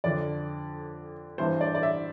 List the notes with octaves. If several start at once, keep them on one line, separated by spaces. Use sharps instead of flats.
F2 D3 D5
G2 E3 C5
D5
D5
E5